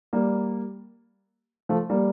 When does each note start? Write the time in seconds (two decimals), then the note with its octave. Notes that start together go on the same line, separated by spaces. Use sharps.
0.13 G3 A#3
1.69 F3 A3
1.90 G3 A#3